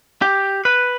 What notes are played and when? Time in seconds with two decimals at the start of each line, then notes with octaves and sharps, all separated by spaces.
0.22 G4
0.65 B4